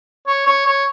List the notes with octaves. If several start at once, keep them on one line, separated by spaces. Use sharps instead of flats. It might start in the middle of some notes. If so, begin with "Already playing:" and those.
C#5
C#5
C#5